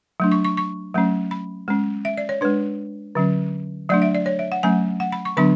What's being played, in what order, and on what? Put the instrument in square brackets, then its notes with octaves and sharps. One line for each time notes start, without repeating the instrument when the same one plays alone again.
[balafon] F#3 A3 D4
C#6
C#6
C#6
F#3 A3 C#4
B5
G#3 C#4
E5
D5
C#5
G#3 D4 B4
D3 F#3 C#4
F#3 A3 D4 D5
E5
D5
C#5
E5
F#5
F#3 A3 C#4 G#5
F#5
B5
C#6
D3 F#3 B3 D4 B5